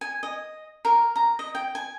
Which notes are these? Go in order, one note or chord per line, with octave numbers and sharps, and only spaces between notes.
G#5
D#5
A#4
A#5
D#5
G5
G#5